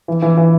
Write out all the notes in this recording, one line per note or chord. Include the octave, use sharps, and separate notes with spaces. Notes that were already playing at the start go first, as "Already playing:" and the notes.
E3
E3
E3